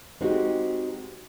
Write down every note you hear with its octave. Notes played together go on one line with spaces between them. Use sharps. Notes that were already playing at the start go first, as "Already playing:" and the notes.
G#3 C4 D#4 F#4 G4